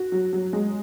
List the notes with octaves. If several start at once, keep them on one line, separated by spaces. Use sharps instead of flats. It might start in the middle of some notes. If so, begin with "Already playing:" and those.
Already playing: F#4
F#3
F#3
G#3